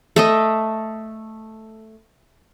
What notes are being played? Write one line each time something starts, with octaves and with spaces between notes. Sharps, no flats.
A3 A4 D#5